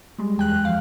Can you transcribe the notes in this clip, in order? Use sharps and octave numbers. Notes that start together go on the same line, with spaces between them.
G3 G#3
E2 G5 F#6
F#2
F3 F5